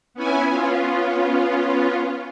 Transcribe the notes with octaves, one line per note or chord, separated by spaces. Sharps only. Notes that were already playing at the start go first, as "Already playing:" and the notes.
B3 C#4 E4 G#5
B3 C#4 F4